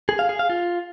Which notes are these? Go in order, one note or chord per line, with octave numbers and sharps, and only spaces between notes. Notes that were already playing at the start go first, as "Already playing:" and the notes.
G#4
F5
G#4
F5
F4